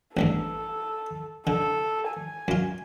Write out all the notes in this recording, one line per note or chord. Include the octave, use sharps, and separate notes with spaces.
A1 E2 G2 A4
D3 A4
G#5
F#2 F4